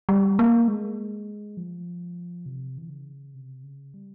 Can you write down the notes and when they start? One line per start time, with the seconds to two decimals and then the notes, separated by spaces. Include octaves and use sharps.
0.09 G3
0.39 A#3
0.68 G#3
1.57 F3
2.46 C3
2.78 E3
2.90 C#3
3.34 C3
3.63 C#3
3.94 G3